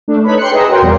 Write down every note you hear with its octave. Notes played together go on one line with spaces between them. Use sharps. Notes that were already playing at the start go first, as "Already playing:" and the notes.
A3 D4
D#4 A4 B4 C#5 B5
G4 C6 F#6 C#7
G#4 B4 D#5 E5 A#5
F#4 A#4 C#5 G5 C6
E2 A#2 G3 A#3